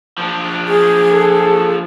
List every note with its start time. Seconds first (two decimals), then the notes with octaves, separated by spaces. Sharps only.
0.18 F3 D4
0.67 G#4
1.11 A4